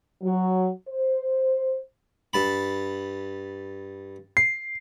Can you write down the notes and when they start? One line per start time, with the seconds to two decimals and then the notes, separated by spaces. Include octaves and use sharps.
0.22 F#3
0.88 C5
2.33 G2 A5 B5
4.37 C7